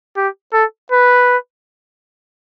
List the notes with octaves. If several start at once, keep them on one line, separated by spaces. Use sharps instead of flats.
G4
A4
B4